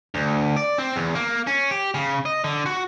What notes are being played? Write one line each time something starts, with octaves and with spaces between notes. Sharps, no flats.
D2
D5
C4
E2
A#3
C#4
G4
C#3
D#5
D3
F#4